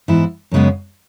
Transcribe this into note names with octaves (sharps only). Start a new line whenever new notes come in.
G#2 E3 B3 E4
F#2 C#3 G#3 B3